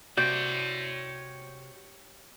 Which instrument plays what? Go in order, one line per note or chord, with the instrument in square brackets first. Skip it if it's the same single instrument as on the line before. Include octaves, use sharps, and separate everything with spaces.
[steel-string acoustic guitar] C3 [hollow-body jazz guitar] F#4 D5 [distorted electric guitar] C#5 G5 [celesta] G6